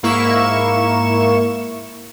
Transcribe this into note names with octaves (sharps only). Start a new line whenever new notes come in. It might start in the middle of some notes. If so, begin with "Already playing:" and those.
G#2 A#3 E4 C#6 E7